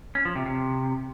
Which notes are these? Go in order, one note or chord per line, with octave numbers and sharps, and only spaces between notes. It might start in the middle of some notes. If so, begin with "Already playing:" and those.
C#4
F3
C3
C3